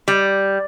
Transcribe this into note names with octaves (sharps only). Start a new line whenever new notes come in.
G3